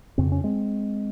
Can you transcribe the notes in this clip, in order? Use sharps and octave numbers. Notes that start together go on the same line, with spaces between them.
F2 C#3 C4
C#4
G#3 C4